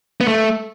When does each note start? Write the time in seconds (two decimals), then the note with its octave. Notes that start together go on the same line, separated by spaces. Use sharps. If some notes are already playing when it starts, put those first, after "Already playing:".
0.21 B3
0.28 A3